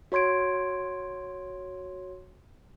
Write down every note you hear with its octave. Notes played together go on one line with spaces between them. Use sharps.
F#4 C#5 C6 G#6 D7